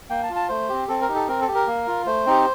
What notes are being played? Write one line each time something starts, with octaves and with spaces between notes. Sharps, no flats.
A#3 G5
A5
F4
A5
A3 C5
C4 G4
C4 A4
A#4
D#4 G4
A4
C4 A#4
A4
G4
A#4
A#3
F4
A3 C5
C4 D#4 G4